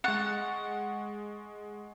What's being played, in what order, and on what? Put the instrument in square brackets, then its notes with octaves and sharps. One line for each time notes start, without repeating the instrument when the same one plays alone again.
[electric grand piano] G#3 C#6 A6 [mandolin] F#5